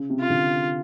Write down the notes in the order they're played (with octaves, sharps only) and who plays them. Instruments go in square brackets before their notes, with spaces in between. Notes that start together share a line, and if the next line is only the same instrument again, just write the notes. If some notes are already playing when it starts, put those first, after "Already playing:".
Already playing: [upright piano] C#3
C3
[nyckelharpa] F4
[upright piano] D3